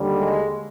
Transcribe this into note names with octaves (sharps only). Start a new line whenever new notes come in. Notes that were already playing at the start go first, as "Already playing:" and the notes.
Already playing: D#2 D3 G3
G#3